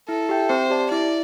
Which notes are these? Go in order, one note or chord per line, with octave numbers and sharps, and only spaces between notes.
E4 A4
G4 E5 G5
C4 C5
G4 D5 A5
E4 D5